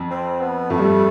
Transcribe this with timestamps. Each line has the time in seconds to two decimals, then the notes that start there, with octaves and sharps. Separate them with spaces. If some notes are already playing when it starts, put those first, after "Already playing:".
Already playing: F2
0.10 C4
0.40 B3
0.70 F2 A3
0.78 G2